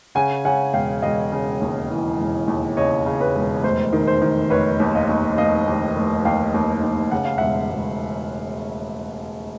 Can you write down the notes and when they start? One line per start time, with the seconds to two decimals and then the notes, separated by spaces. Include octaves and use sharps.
0.15 C#3 F#5 G#5
0.45 C#3 F#5 G#5
0.73 E1 F5 G5
1.02 E1 D#5 F5
1.32 C#3
1.61 D#2
1.90 E3
2.18 E1
2.48 D#2
2.77 C#3 C#5 D#5
3.06 C#3
3.20 B4 C#5
3.35 E1
3.63 F1 C5
3.93 D#3
4.07 C5
4.22 D#3
4.50 F1 B4 C#5
4.80 D#2
4.95 D#5 F5
5.09 D#2
5.37 F1 D#5 F5
5.67 D#2
5.96 F1
6.25 D#2 F5 G5
6.54 D#2
6.83 D#2
7.12 C#3 F#5
7.25 F5
7.38 E1 E5 F#5
7.70 E1